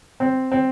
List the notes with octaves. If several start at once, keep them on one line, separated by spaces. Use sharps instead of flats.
C4
C4